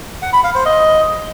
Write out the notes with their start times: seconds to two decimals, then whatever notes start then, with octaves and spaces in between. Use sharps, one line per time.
0.22 F#5
0.33 B5
0.44 F5
0.55 C5
0.66 D#5